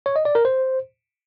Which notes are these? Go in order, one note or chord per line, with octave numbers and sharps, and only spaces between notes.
C#5
D#5
D5
A#4
C5